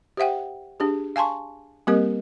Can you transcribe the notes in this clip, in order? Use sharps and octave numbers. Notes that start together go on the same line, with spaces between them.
G4 C5 E5 F#5 G5
D4 G4 G#4
F5 G#5 A5 C6 C#6
G3 A#3 C4 G4 A#4 D#5